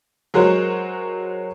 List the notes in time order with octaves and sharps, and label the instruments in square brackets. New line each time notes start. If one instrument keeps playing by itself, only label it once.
[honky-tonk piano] F#3 G#3 F#4 A#4 C5 C#5